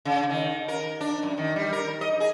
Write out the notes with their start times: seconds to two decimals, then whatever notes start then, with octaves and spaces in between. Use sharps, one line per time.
0.05 C#3
0.30 D#3
0.68 A#4
1.01 D4
1.23 F#2
1.38 D#3
1.56 G3
1.73 A#4
2.01 D#5
2.20 G#4